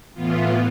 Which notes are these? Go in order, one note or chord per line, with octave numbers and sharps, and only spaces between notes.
A2 E3 B3 F4